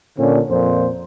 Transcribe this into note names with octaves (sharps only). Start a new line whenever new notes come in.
A#2 D3 C#4
F2 A#2 C5